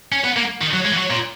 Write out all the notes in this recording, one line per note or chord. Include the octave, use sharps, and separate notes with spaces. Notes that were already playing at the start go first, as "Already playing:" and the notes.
C#4
B3
A#3
D#3
F#3
G#3
E3
F#3
A#2